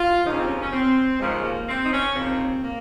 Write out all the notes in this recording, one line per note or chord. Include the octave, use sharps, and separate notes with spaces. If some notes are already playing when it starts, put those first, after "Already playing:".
Already playing: F4
D#2 C#3 F3 D#4
C#4
C4
C#4
C#4
C4
D#2 C#3 F3 G#3
A#3
C4
D#4
C#4
D#2 C#3 F3 C4
A#3